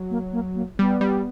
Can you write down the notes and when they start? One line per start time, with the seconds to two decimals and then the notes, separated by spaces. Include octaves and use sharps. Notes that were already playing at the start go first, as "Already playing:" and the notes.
Already playing: F#3
0.10 A#3
0.32 A#3
0.55 A#3
0.79 G3 B3
1.01 G3